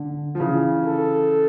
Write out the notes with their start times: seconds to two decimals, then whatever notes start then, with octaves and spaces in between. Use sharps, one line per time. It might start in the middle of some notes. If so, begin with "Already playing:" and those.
Already playing: D3
0.35 F3
0.40 C#3 E3
0.86 A4